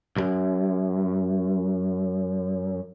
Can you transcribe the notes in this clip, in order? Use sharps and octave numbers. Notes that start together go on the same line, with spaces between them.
C2 F#2